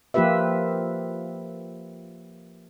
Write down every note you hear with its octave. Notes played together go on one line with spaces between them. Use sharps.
F3 A#3 F4 G4 B4 E5